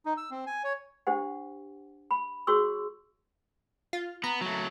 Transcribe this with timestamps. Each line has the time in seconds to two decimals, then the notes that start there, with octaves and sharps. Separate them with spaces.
0.06 D#4
0.17 E6
0.31 C4
0.47 G#5
0.64 C#5
1.07 D4 G4 C5 F#5
2.11 B5
2.47 F#4 G#4 C#5 C6 C#6 E6
3.93 F4
4.24 B3 A#5
4.41 F#3 A3